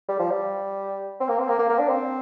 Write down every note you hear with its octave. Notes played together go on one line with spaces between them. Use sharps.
G3
F3
G3
C4
A#3
C4
A#3
A#3
A#3
D4
C4